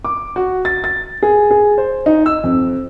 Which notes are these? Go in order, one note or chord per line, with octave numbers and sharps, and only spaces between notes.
D6
F#4
A6
A6
G#4
G#4
C5
D#4
E6
F2